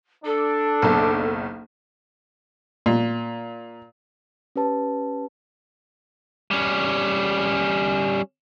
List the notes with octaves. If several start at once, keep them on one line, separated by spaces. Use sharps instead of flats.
D4 A4
F#1 B1
A#2
C#4 G4 B4 A5
G3 C#4